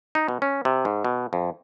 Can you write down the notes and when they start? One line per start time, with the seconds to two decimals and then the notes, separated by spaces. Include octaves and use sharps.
0.15 D#4
0.28 B2
0.42 C#4
0.65 C3
0.85 G#2
1.05 B2
1.33 F2